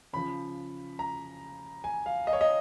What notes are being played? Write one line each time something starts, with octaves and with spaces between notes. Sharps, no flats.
C#3 F3 B5
A#5
G#5
F5
D#5
C#5
D#5